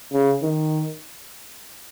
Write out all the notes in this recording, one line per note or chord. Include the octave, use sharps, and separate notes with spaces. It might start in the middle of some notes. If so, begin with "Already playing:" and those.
C#3
D#3